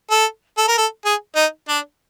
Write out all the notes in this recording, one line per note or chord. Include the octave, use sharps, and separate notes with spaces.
A4
A4
A#4
A4
G#4
D#4
D4